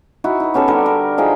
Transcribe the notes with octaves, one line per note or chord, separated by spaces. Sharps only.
D#4 E4 F#4
D#4 B4
B3 C#4 G4 A4
D3 G3 A4 A#4
A#4
F3 D#4 G#4 G5